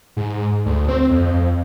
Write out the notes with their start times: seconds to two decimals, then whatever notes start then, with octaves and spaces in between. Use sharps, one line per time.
0.17 G#2
0.66 D2
0.89 C4
1.10 F2